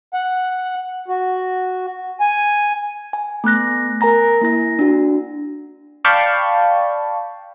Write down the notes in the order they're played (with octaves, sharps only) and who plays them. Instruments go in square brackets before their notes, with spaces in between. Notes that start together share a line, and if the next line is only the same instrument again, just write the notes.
[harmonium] F#5
F#4
G#5
[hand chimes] G#5
A3 B3 F#6 A#6
A#4 G#5 A#5 A#6
A#3 E4 A#6
D4 F#4
[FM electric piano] D5 F5 G5 A5 B5 C#6